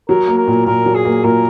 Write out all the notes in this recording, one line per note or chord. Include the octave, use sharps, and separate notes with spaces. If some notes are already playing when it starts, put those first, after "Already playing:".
F#3 A#4
A#3
A#4
A#2
A#2 A#4
F#3
G#4
A#3
A#2 A#4